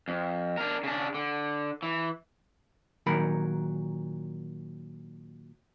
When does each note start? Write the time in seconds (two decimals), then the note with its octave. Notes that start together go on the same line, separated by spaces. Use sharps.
0.08 F2
0.58 D4 A#4
0.83 C#3 D4
1.14 D3
1.83 E3
3.06 A#2 D#3 F#3 A#4 B5